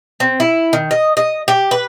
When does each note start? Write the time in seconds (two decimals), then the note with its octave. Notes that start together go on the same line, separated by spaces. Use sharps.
0.20 C4
0.40 E4
0.73 D#3
0.91 D#5
1.17 D#5
1.48 G4
1.71 B4